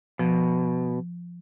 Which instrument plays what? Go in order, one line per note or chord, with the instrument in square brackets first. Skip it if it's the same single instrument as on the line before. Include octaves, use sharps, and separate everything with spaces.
[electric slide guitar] B2 [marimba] F3